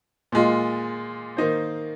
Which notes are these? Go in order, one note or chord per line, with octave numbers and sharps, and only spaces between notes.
A#2 G#3 F4
D#3 A#3 D#4 C5